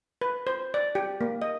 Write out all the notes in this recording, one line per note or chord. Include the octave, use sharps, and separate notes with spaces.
B4
C5
D5
G4
A#3
D#5